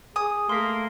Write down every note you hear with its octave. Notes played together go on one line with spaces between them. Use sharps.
G#4 G#5 D#6
A3 A#3 C6 B6